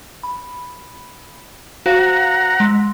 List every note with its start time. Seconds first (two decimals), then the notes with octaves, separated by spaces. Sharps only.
0.23 B5
1.86 F#4 C5 F5 F#5 A#5
2.60 G#3 C6 B6